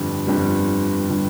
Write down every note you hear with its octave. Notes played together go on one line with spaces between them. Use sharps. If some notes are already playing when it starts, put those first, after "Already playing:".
Already playing: G1 F2 D3 G3
G1 F2 D3 G3
D3 G3